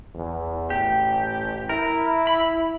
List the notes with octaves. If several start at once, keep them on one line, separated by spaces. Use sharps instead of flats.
E2
A1 G4
E4 A#4
B5